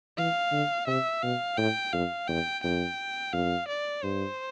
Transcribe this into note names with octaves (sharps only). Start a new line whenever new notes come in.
E3 F5
D3
C3 E5
B2 F5
A2 G5
F2 F5
E2 G5
F2 G5
F2 F5
D5
G2 C5